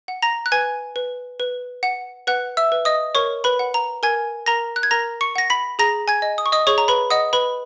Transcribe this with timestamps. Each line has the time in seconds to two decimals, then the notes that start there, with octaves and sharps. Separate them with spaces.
0.08 F#5
0.22 A#5 A#6
0.46 F#6
0.52 B4 G#5 G#6
0.96 B4
1.40 B4
1.83 F#5
2.27 B4 F#5 F#6
2.57 E5 E6
2.72 B4
2.85 D#5 D#6
3.15 A#4 C#5 C#6
3.44 B4 B5
3.59 F#5
3.74 A#5
4.03 A#4 G#5 G#6
4.46 A#4 A#5 A#6
4.76 F#6
4.83 G#6
4.91 A#4 A#5 A#6
5.21 C#6 C#7
5.36 F#5 A#6
5.50 B5 B6
5.79 G#4 A#5 A#6
6.08 G#5 G#6
6.22 D#5
6.38 D#6
6.46 C#6
6.52 D#5 D#6
6.67 G#4 C#5 C#6
6.78 A#5
6.88 B4 B5
7.10 D#5 F#5 D#6
7.33 B4 B5